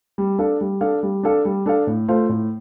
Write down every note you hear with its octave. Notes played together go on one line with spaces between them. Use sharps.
G3
D4 A4 F5
G3
D4 A4 F5
G3
D4 A4 F5
G3
D4 A4 F5
A2
A3 F4 C5 F5
A2